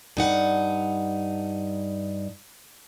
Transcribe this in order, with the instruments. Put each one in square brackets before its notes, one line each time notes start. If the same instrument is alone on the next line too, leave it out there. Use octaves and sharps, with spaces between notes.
[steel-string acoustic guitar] G2 D#4 F#5